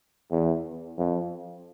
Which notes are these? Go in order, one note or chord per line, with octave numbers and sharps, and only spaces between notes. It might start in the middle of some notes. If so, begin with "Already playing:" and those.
E2
F2